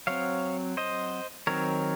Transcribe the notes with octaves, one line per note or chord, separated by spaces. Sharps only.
F#3 C4 C#5 F5
C5 D#5
D#3 F#3 C4 A#4 C#5